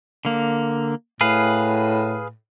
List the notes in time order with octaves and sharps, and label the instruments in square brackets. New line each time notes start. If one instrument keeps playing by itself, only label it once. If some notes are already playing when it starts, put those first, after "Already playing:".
[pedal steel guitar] D3 A#3
[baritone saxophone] A2 [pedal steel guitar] G#4 B4 F5